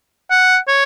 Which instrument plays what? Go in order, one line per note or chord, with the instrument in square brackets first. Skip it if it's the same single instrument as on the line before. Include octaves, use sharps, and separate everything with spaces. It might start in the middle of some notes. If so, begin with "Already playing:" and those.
[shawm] F#5
C#5